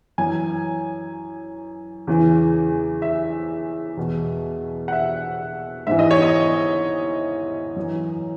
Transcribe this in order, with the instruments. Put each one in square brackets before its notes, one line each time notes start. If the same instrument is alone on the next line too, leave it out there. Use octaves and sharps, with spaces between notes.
[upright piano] F#2 E3 G#5
E2 C#3 E3
E5
E2 B2
F#5
E5
G#2 E3 E5
D#5
C#5
D#5
F#2 E3